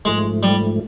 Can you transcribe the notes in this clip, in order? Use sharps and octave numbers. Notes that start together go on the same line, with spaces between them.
G#2 F3 G#3 A3
G3